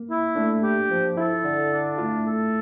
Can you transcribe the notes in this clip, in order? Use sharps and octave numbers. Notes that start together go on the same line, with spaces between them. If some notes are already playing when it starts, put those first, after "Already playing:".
Already playing: A#3
E4
A3 D4
G4
F3
E4 A4
D3
D4
A3 F4
A4